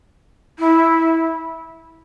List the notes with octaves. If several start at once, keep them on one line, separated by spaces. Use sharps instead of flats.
E4